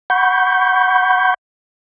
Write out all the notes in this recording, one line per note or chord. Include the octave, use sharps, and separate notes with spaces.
F#5 B5 C#6 G6